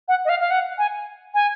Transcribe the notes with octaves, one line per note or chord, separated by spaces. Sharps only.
F#5
D#5
F5
F5
F#5
G#5
G#5